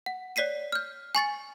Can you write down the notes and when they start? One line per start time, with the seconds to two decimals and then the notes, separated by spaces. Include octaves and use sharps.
0.06 F#5
0.36 C#5 D5 B6 C7 D#7
0.72 F6 G6
1.15 G#5 C#6 A6 C#7